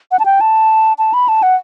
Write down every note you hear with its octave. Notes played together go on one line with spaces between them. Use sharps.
F#5
A5
G5
A5
A5
B5
A5
F#5